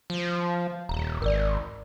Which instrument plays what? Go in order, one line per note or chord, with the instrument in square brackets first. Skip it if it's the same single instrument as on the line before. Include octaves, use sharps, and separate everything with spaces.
[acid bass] F3
[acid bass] D#1 [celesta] A#5
[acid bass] G#1 [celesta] A#4 D5